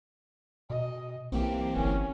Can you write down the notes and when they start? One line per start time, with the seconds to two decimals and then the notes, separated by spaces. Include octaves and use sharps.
0.70 B2 D#5
1.32 B1 E3 A#3 C4 G4
1.76 G1 C#4